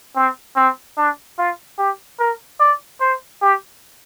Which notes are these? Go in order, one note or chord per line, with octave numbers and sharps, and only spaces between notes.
C4
C4
D4
F4
G4
A#4
D5
C5
G4